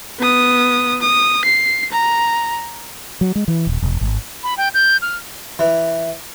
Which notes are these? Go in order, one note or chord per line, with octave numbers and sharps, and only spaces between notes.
B3 D#6
D#6
C7
A#5
F#3
G#3
E3
D#1
E1
G#1
B5
G5
G6
F6
E3